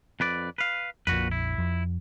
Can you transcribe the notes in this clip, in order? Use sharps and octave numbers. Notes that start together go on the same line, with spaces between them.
F2 B4 D5
B4 F5
A#1 F2 A#2 F#4 B4
E4
F2